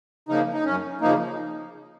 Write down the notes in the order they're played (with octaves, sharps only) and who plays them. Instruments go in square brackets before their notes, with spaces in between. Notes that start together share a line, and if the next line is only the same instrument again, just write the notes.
[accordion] C#3 F3 A#3 D#4
D#4
F#2 C#4
C#3 F3 A#3 D#4